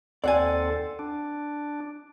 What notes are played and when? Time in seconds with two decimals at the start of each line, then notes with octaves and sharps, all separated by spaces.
0.24 D#2 C4 A4 D5 F#5 G#5
0.99 D4